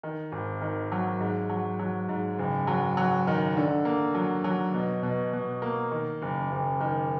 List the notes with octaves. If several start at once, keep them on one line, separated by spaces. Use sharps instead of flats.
D#3
G#1
D#3
F#3
G#2
F#3
F#3
G#2
F#1
F#3
F#3
D#3
D3
A#3
F#3
F#3
B2
B2
B2
A#3
D#3
F#1
F#1
D#3